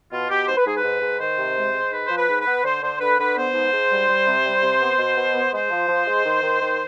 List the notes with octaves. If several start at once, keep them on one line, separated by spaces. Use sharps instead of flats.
B2 F4
B2 G4
G#2 C5
B4
G#2 G#4
B4
G#2
G#2
D#3 C5
C3
G#3
G#3
G#2 B4
F3 C5
B4
G#2
B4
B3
D3 C5
D3 C5
D3 B4
D3 B4
B3 C5
G#2
G#2
G3
G3
C3
G3
C3
B3
B2
B2
B3
G#3 C5
F3
F3
G#3
D#3
D#3
D#3